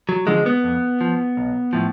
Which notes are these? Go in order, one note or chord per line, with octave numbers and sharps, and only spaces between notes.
F#3
D3 F3 G#3
B3
F2
F3
B1
A2 F3